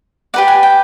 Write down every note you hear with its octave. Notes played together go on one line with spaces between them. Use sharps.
G4 B4 D5 F#5
G#5
G5